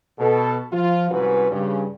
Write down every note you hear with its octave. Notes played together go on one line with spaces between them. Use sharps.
B2 A4
F3 F4
C2 G#2 C#4 F#4 B4
G2 C#3